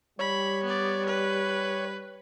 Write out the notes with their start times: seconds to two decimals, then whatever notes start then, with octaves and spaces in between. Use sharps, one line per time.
0.19 G3 C#5 B5
0.63 B3 D5
1.06 B4